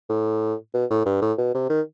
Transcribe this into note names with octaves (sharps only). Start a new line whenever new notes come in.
A2
B2
A2
G2
A2
B2
C3
D#3